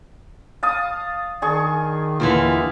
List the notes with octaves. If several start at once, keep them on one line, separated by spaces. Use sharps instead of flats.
F5 A5 D#6
D#3 D4 G#4 C#6
D#2 D3 E3 F4